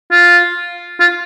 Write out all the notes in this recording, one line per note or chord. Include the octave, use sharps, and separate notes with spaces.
F4
F4